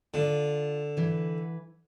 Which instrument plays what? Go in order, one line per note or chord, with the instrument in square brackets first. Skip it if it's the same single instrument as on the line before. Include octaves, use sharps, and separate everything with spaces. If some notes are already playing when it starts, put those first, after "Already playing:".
[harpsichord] D3 [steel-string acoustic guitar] F4
[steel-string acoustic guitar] E3 B4